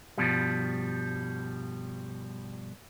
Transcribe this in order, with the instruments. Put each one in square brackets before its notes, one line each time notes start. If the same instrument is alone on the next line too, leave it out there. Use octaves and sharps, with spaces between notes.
[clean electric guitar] G2 B2 F3 G3